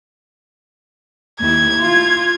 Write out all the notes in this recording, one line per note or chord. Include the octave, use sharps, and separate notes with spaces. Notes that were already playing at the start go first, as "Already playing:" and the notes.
D#2 E4 G#6
F4